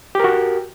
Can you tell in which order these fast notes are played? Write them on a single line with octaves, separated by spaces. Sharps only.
G4 A#4 F#4